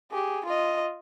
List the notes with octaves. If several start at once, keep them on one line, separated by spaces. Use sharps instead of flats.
G4 G#4
F4 D#5